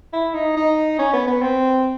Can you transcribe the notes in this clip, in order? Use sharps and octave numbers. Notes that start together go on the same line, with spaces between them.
E4
D#4
D#4
C#4
B3
B3
C4